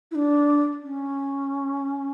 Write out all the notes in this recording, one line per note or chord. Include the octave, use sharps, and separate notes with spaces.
E4
D4
C#4